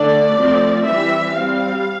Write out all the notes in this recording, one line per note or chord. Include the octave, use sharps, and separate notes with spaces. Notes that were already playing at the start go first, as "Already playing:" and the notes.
Already playing: D3 A3 D4 D5
F3 A3 C4
E3 G3 C4 E5
G3 C4 F5